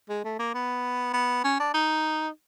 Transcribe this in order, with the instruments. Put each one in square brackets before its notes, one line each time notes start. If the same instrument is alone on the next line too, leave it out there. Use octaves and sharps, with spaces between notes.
[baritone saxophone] G#3
A3
A#3
B3
B3
C#4
D4
D#4